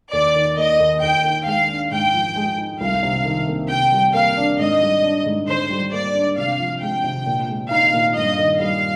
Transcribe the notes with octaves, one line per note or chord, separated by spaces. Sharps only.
D#2 D5
D#3
A#3 D#5
D#2
D#2 G5
D#3
G#3 F5
D4
G#2 G5
F3
G#3
D#4
C2 F5
C3
D#3
A#3
C3 G5
G3
A#3 F5
D4
G#2 D#5
G3
D4
G#2
D3 C5
G3
A#3 D5
D4
C3 F5
F3
G#3 G5
C3
A#2
G#3
D#4 F5
A#2
G2 D#5
D#3
G3 F5